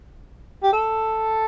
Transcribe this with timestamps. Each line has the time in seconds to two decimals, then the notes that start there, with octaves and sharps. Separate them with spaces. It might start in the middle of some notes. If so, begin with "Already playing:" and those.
0.63 G4
0.73 A4